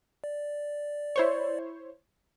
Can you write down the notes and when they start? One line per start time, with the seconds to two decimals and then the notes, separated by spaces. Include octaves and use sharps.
0.24 D5
1.16 E4 C5 C#5